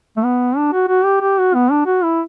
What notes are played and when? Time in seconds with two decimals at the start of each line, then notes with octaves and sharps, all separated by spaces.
0.17 A3
0.23 B3
0.57 D4
0.72 F#4
0.88 F#4
1.04 G4
1.21 G4
1.38 F#4
1.54 B3
1.71 D4
1.86 F#4
2.04 E4